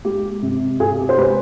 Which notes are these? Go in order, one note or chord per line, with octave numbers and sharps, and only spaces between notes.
G#3 G4
C3
C3 G#4
G4
C5
G#3 G4 B4